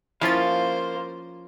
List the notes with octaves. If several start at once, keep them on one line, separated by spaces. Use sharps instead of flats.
F3 A#3 C#4 E4 F4 C5 F5 A6